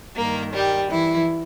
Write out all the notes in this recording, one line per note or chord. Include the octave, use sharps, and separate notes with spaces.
G2 D#3 A#3 A#4
G3 G4
E3 E4